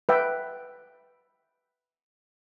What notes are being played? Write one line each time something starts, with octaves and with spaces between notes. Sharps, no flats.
B4 E5 G5